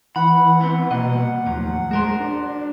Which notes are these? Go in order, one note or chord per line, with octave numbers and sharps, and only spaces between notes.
E3 F#5 B5
B3 C4
C2 B2 A#3 D#5 F#5
D#2 A2 F3 F#3
G#3 F#4 A#4 C5
D4